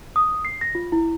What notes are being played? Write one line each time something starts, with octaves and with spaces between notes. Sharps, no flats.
D#6
C7
A#6
F4
E4